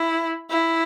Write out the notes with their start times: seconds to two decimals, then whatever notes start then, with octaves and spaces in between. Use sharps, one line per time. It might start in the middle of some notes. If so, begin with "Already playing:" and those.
Already playing: E4
0.50 E4